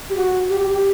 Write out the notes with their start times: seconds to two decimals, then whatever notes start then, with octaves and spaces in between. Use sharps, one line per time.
0.09 G4
0.15 F#4
0.48 G4
0.59 G4
0.70 G4